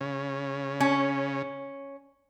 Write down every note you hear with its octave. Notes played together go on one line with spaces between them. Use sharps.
C#3
C#4